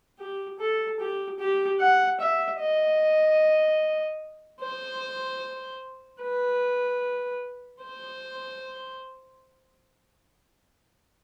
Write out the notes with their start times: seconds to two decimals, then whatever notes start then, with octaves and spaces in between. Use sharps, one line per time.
0.19 G4
0.59 A4
1.00 G4
1.40 G4
1.80 F#5
2.20 E5
2.60 D#5
4.61 C5
6.22 B4
7.82 C5